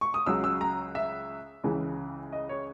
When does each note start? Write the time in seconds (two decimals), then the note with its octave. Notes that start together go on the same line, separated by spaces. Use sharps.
0.01 C#6
0.14 D#6
0.26 C#2 C#3 F#3 E6
0.44 E6
0.61 A#5
0.95 E5
1.64 C#2 C#3 E3
2.33 D#5
2.49 C#5